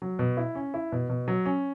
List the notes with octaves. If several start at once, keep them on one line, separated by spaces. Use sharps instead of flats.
F#3
B2
E4
C#4
E4
B2
B2
F#3
C#4